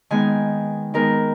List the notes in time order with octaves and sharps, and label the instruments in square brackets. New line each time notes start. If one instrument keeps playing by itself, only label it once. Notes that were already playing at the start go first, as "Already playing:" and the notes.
[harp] D#3 G#3 B3 G#5
D#3 G#3 B3 A#4